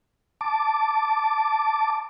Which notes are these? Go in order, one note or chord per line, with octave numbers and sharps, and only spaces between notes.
A5 D6